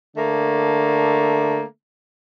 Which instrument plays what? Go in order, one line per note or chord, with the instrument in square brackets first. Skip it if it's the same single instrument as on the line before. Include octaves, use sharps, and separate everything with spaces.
[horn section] D3 A3 A#3